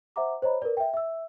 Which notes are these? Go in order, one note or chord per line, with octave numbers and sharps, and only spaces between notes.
C5 E5 F#5 A#5 D6
C5 C#5 D#5 A#5 B5
A#4 B4 D5
E5 G5
E5 E6